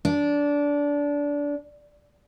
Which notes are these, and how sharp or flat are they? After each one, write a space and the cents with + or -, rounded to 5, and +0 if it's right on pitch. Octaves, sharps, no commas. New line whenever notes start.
D4 -20